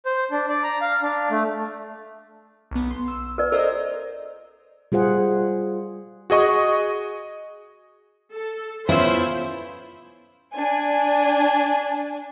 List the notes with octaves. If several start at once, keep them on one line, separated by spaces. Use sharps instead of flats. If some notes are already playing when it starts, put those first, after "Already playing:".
C5
D4
D5
A#5
F5
D4
A3
B1 B3
C6
E6
A#4 B4 D5
A4 A#4 C5 D5 D#5
G3 F4 G#4 C5 F#5
F#4 G#4 D#5 C#6 D#6
A4
B3 C#4 E4 F4 C5 E5
D4 G#5